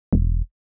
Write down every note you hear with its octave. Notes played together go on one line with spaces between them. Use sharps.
E1